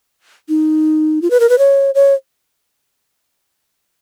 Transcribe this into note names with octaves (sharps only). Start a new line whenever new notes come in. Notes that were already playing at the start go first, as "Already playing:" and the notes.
D#4
F4
B4
A#4
B4
C#5
C#5